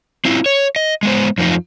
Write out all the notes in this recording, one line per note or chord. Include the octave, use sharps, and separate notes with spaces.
C4 E4 F4
C#5
D#5
G#3 B3 C5
F2 F3 C4 D#4 F4